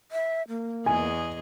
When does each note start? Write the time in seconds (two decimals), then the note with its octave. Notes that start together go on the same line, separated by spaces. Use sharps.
0.12 E5
0.49 A#3
0.86 E2 G#4 D#5 G#5